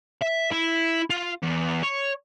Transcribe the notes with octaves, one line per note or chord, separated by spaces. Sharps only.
E5
E4
F4
E2
C#5